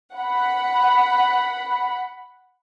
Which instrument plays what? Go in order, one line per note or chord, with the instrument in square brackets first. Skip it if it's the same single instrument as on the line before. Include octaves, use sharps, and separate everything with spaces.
[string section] F#5 B5